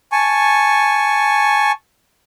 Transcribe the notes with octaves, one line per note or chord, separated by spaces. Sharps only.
G#5 A5 C#6